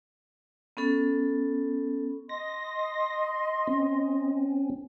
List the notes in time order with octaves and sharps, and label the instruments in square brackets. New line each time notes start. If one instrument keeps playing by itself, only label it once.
[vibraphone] B3 C#4 A4
[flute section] D#5 C6 [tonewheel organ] A#6
[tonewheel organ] C4 C#4